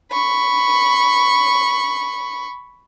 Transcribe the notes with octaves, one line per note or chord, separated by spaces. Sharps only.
B5 C#6